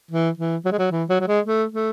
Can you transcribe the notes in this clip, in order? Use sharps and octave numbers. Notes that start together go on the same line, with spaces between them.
E3
E3
F#3
G#3
F#3
E3
F#3
F#3
G#3
A3
A3